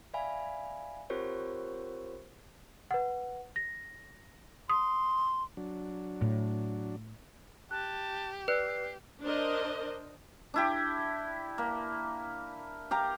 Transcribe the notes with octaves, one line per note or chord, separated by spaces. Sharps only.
D5 E5 F5 G#5 B5
C4 F4 G4 A#4 C5 C#5
B4 F#5
A#6
C6 D#6
F#3 D4
A2
G4 A5 F#6
B4 D5 F6 F#6 C7
D4 A#4 C5 D#5
D4 E4 G4
A#3
G4 F5 A#5